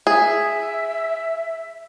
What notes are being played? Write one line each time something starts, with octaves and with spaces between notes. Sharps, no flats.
G#4 E5